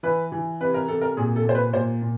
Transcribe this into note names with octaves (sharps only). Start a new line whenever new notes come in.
E3 B4
E3
C3 B4
A#4
C3 A4
A#4
A#2 G#4
A4
A#2 C5
B4
A#2 C5
A#2